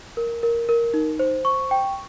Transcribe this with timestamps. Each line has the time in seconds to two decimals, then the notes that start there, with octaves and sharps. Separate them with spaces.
0.17 A#4
0.43 A#4
0.69 A#4
0.94 D#4
1.19 C5
1.45 C#6
1.71 G5